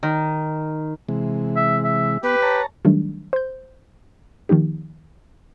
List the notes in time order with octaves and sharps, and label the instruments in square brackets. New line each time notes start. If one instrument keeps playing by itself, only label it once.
[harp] D#3
[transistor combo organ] C3 E3 G#3
[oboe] E5
E5
[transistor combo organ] B3 [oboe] G4 [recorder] B4
[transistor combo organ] C#5 A5 A#5
[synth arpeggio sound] D#3 F#3 G3 A3 D4
C5 G6
D#3 F3 A#3 D#4 G4